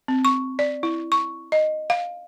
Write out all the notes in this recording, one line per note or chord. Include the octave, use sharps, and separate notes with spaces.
C4
C#6
D5
E4
C#6
D#5
F5